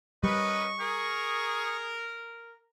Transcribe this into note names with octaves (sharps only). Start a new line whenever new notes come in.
G3 C#4 A#4 B4 D#5 C#6
G#4 A#4